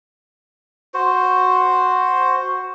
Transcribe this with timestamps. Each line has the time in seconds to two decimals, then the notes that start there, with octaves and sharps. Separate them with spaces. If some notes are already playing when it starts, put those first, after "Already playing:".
0.94 F#4 C5